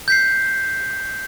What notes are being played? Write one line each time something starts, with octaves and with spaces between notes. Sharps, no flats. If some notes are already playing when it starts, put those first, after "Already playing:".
G6 B6 C7